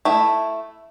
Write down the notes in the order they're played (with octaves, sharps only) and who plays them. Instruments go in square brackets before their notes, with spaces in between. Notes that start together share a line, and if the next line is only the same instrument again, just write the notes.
[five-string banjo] A3 E4